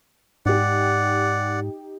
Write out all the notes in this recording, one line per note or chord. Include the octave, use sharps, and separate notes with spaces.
G#2 D#4 G4 D5 F#5